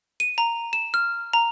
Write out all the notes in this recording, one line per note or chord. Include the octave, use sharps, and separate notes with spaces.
D#7
A#5
E7
F6
A#5